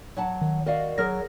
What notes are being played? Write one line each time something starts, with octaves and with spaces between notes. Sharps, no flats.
F#3 F#5 A5
D#3
F#4 A#4 D5 D#5 F5
F#3 G#4 A#4 F6 A#6